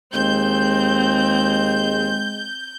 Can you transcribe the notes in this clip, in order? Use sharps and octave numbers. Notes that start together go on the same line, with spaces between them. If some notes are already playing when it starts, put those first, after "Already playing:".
D#2 G#3 C4 G6